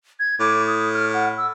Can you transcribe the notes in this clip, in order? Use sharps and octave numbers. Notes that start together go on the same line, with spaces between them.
G#6
A2 D6
D#6
F6
F#5
E6